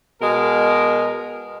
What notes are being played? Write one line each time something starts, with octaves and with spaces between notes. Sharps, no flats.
B2 G#3 A#4